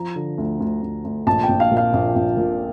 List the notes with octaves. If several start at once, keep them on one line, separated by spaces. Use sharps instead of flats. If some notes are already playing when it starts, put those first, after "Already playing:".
Already playing: F3 A#5
D3
D2
D2
D2
D2
A#1 A5
G5
A#1
F5
A#2
F5
A#1
A#1
A#2